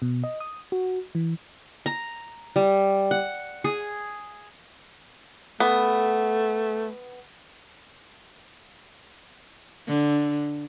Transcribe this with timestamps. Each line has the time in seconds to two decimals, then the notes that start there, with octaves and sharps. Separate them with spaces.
0.02 B2
0.24 D#5
0.40 D#6
0.72 F#4
1.15 E3
1.86 A#5
2.56 G3
3.11 F#5
3.64 G#4
5.60 A3 B3
9.87 D3